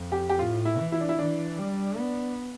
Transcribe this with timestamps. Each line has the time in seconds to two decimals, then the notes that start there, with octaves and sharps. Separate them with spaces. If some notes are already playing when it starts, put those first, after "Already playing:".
Already playing: F2
0.12 G4
0.29 G4
0.39 A2 F4
0.65 E4
0.78 E3
0.92 E4
1.00 D4
1.09 E4
1.18 E3 D4
1.59 G3
1.98 B3